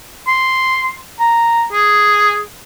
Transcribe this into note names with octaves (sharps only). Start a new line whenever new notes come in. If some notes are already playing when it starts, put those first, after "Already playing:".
C6
A#5
G#4